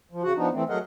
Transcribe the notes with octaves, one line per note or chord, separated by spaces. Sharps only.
F3
C#3 F#4 F#5
F3 B3 D4 D#4
E3 A3 C4
F#3 A3 G#4 A#4 D#5 F#5